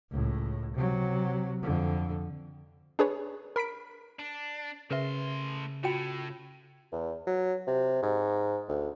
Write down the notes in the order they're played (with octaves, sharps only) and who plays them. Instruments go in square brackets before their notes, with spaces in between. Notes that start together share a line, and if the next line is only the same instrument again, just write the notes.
[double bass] C#2 A2
C3 F#3
F2 D3
[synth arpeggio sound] D4 G#4 B4 C#5
A#4 B5 B6 D7
[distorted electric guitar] D4
[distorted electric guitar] A2 C6 [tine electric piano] C#3 [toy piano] A#4 B4 E5
[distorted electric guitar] A2 [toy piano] F4 F#4 G5
[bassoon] E2
F#3
C3
G#2
D2